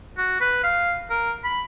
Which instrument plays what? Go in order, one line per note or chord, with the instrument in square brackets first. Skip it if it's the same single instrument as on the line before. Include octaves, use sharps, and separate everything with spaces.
[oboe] F#4
B4
F5
A#4
B5